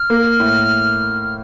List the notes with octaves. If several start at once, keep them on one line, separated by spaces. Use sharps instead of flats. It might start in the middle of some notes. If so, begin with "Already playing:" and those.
Already playing: F6
A#3
A2